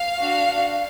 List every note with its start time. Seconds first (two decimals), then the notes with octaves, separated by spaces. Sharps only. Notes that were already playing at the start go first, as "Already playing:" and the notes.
Already playing: F5
0.22 D4 F#4